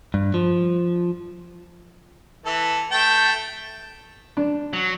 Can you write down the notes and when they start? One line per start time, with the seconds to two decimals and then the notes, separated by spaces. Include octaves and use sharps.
0.14 G2
0.34 F3
2.46 E3 A4
2.92 A3 G5 A5
4.37 D4
4.73 F#3